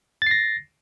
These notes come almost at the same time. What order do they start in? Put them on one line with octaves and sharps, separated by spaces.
A6 C7 A#6